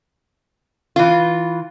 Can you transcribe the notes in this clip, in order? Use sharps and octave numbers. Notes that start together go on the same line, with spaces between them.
E3 F4